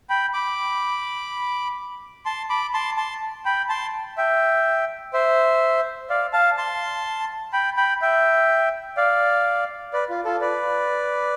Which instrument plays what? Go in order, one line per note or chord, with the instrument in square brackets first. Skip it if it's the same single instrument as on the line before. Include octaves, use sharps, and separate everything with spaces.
[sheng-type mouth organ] G5 B5
B5 D6
A5 C6
B5 D6
A5 C6
A5 C6
G5 B5
A5 C6
E5 G5
C5 E5
D5 F5
F5 A5
A5 C6
G5 B5
G5 B5
E5 G5
D5 F5
B4 D5
F4
F4 A4
B4 D5